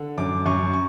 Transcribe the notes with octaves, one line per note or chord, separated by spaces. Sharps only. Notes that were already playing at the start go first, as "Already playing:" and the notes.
Already playing: D3
F#2 D6
F#2 C#6
C#6